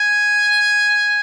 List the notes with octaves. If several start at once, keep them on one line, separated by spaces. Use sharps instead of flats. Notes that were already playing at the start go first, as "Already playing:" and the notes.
Already playing: G#5